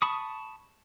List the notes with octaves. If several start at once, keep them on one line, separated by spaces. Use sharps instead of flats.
A5 B5 C#6 D#6